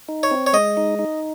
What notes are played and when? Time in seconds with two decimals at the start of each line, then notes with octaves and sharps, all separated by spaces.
0.09 D#4
0.23 C#5
0.31 C4
0.47 C#5
0.53 G#3 D#5
0.77 D#4
0.99 D#4